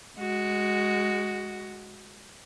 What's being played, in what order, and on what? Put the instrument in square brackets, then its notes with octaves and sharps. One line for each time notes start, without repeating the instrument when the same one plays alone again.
[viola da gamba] G#3 F#4